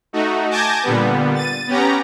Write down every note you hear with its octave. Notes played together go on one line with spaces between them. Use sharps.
A3 D#4 F#4
G#5 A5 D6 G6 G#6 A#6
A#2 D3 G3 B3
A6 D#7
B3 C#4 G4 A#5